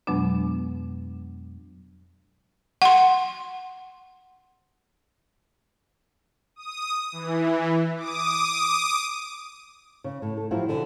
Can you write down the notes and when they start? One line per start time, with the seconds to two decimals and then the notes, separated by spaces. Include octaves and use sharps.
0.07 F2 B2 F#3 G#3 B3 D4
2.82 F#5 C6
6.56 D#6
7.12 E3
7.96 D6 D#6
10.04 C#3
10.22 A2
10.37 A4
10.51 F3 F#3 E4 F4 G4 C5
10.68 B2 D3 E3